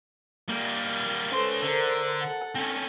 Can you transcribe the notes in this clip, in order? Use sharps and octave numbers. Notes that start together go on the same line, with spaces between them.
G3 A#3
C#4 A4 B4 C5 C6
D3 A#4 C5
A4 F#5
C4 C#4 A4